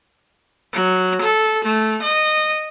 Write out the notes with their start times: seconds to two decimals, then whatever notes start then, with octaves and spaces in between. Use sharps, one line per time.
0.73 F#3
1.21 A4
1.65 A3
2.02 D#5